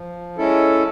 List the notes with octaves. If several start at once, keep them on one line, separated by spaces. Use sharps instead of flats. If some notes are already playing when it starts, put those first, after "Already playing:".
Already playing: F3
G#3 C#4 E4 A4